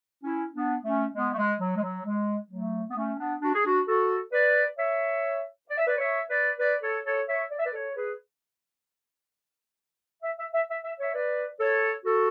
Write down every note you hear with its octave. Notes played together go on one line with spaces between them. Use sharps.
C#4 E4
B3 D4
A3 C#4
G#3 B3
A3
G#3
F#3
G#3
F#3
G#3
F#3 A3
B3
A3 C#4
B3 D4
D4 F#4
G#4
D4 F#4
F#4 A4
B4 D5
C#5 E5
D5
E5
B4 D5
C#5 E5
B4 D5
B4 D5
A4 C#5
A4 C#5
C#5 E5
D5
E5
B4 D5
A4 C#5
G#4 B4
E5
E5
E5
E5
E5
C#5 E5
B4 D5
A4 C#5
F#4 A4